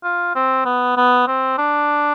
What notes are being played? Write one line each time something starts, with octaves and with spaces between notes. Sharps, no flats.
F4
C4
B3
B3
C4
D4